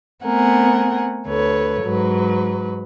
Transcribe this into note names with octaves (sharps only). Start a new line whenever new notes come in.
A3 B3 C4 A#4 F#5 G#5
D2 A4 B4 C#5
G#2 F#3 B4